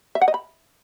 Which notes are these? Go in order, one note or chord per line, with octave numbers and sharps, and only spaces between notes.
E5
F#5
D#5
B5